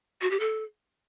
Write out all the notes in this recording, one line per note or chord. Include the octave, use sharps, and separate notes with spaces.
F#4
G4
A4